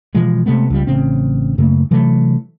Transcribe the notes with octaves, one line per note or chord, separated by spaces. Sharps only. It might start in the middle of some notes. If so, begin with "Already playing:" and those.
B2 E3 F3 G#3
C3 G#3 A3 B3
C#2 G3
A1 C#3 C4
F#2 C#3 A3 A#3
C3 E3 F#3 A3